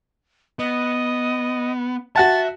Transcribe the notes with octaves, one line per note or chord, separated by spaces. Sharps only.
B3 D#5
F#4 E5 F#5 A5 A6